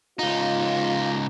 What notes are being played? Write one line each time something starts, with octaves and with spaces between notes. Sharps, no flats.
C#2 D#4 F4